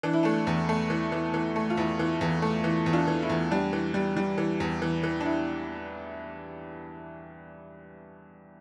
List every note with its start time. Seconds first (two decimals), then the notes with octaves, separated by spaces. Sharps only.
0.03 E3 D4
0.13 E4
0.23 A3 D4
0.47 E2
0.69 A3
0.90 E3
1.12 E3
1.34 E3
1.56 A3
1.70 F4
1.77 E2 E4
1.99 E3
2.21 E2
2.42 A3
2.64 E3
2.86 E2
2.93 D4 F4
3.07 E3
3.22 E4
3.30 E2
3.51 G3 D4
3.73 E3
3.94 G3
4.17 G3
4.38 E3
4.60 E2
4.82 E3
5.03 E3
5.20 D4
5.25 E4